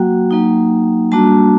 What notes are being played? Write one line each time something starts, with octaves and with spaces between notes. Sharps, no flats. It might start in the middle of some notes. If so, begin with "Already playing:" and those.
Already playing: F#3 A#3 F#4 G5
F#3 A#3 D#4
G3 A#3 D4 F#4 A5